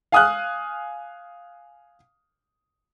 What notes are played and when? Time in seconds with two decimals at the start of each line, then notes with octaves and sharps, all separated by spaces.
0.12 F5 G#5 D#6 F6 F#6